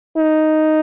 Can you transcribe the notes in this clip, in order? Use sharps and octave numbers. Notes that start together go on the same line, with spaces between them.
D#4